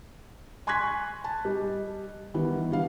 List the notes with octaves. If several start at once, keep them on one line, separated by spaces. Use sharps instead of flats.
G#5 C6 C#6 F#6 G#6 B6
A5
G3 G4 D#5
D#3 E3 G3 B3 E4
D3 G3 F5